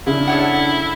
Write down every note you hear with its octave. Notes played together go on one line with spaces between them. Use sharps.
C#3 D4 E4
A4 C#5 F#5